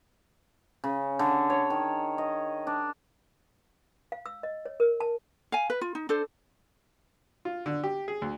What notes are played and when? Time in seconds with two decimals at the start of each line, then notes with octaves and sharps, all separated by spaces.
0.84 C#3
1.19 D3
1.50 C#5
1.70 D#3
2.18 D#5
2.67 D4
4.12 F5
4.26 E6
4.43 D#5
4.66 C#5
4.80 A#4
5.00 A5
5.52 F5 G#5
5.70 B4
5.81 F4
5.95 D#4
6.09 D4 A4 C5
7.45 F4
7.66 D3
7.84 G4
8.08 G#4
8.22 D2